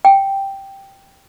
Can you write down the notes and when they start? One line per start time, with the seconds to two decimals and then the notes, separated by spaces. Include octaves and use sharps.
0.05 G5